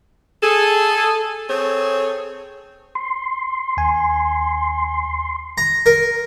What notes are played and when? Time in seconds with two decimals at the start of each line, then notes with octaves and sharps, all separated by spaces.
0.43 G#4 A4
1.50 C4 G#4 A4 C#5
2.95 C6
3.77 D#2 G#5
5.58 A#5
5.86 A#4